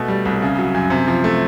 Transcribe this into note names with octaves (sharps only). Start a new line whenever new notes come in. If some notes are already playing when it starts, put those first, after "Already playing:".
Already playing: B2 A3
G3
C2
C#3
F#3
F#2
C3
F3
A3